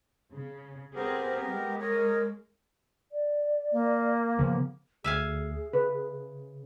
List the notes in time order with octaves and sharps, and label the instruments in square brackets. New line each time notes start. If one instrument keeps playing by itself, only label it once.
[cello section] C#3
[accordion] B3 G4 A#4 [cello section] C4 G#4
[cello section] G#3
[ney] A#4 [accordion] C#5 D#5
[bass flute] D5
[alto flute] A#3
[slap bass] C#3 F3 [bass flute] B3
[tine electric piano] D2 [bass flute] G#4 [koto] E5 F5 G#5
[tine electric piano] C#3 [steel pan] B4